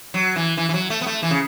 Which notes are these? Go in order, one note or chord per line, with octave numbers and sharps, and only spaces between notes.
F#3
E3
E3
E3
F#3
A3
B3
A3
E3
C#3